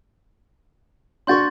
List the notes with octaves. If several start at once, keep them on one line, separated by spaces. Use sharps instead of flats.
D4 F#4 C6 C#6 G6 A6